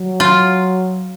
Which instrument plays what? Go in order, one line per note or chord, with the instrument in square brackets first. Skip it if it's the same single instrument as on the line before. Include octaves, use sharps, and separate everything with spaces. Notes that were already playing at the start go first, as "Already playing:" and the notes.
Already playing: [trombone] F#3
[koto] F4